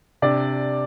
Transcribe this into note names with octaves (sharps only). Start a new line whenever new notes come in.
C3 D4 D5